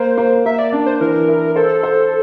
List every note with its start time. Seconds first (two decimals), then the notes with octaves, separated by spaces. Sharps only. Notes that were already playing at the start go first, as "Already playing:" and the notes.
Already playing: A#3 C5
0.18 A#3
0.46 A#3 E5
0.59 D5
0.73 D4
0.86 C5
1.00 E3 A#4
1.28 E4
1.56 A4 C5
1.83 C5